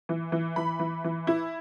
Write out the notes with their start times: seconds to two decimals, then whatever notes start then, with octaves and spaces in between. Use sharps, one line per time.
0.09 E3
0.32 E3
0.56 E3 B5
0.79 E3
1.04 E3
1.27 E4